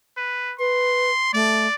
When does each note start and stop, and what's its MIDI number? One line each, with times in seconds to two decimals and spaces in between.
0.17 0.54 71
0.59 1.11 71
0.59 1.32 84
1.33 1.67 57
1.33 1.75 74